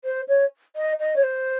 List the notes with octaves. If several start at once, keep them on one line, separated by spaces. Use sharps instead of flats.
C5
C#5
D#5
D#5
C#5
C5